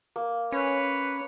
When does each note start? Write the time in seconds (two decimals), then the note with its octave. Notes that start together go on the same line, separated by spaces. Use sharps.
0.16 A#3
0.52 C#4 B4 C#5